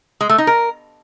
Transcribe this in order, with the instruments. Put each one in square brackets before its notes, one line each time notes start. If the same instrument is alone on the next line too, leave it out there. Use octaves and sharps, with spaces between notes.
[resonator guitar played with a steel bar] G#3
A3
D#4
A#4